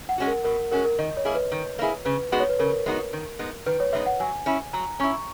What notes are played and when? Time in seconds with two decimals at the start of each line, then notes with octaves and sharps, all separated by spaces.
0.09 F#5
0.18 G#3 C#4 F#4
0.27 A#4
0.44 B2 A#4
0.72 G#3 C#4 F#4 A#4
0.85 A#4
0.99 D#3 D#5
1.17 C#5
1.25 A#3 E4 G#4
1.35 B4
1.52 D#3
1.79 A#3 E4 G#4
2.05 C#3 B4
2.32 G#3 B3 D#4 F#4
2.40 C#5
2.49 B4
2.59 C#3 A#4
2.86 G#3 B3 D#4 F#4
3.13 D#3
3.39 G#3 B3 D#4
3.66 D#3 B4
3.80 C#5
3.93 G#3 B3 D#4 E5
4.06 F#5
4.20 F#3 G#5
4.46 C#4 E4
4.73 F#3 A#5
5.00 C#4 E4 C#6